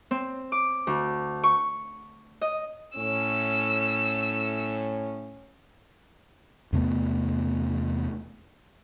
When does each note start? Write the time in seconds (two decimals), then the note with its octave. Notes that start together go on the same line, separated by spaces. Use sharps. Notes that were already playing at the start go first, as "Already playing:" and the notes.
0.11 C4
0.52 D6
0.87 D2
1.43 C#6
2.41 D#5
2.96 A2 C#4 E6
6.73 E2 C3 A3 B3